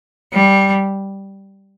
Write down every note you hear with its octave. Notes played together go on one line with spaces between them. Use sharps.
G3